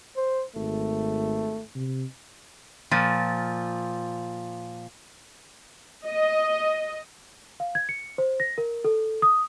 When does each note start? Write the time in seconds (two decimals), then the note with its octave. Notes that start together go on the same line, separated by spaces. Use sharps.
0.17 C5
0.56 G#1 A3
1.75 C3
2.91 A#2 F3
6.07 D#5
7.60 F5
7.75 G#6
7.89 C#7
8.18 C5
8.40 A#6
8.58 A#4
8.84 A4
9.22 D#6